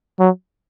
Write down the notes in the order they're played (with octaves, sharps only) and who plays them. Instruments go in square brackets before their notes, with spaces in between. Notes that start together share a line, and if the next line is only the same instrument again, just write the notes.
[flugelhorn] F#3